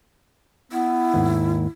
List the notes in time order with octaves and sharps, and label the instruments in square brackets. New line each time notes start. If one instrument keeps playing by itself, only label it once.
[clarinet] B3 [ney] E4
[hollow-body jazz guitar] D#2 G#2